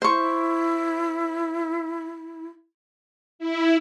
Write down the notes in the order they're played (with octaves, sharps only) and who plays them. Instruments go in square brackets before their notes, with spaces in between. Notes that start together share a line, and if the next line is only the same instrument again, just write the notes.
[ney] E4 [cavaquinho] C5 C#6
[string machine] E4